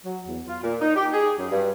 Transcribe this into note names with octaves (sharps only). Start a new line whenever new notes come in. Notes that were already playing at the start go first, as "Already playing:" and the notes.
F#3
E2
F4
A#2
D#4
G4
G#4
F#2
G2